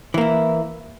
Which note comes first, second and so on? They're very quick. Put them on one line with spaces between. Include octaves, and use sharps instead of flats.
E3 A#3 E4